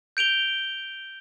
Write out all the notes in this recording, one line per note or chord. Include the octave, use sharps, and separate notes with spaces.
G6 D7 F7 G7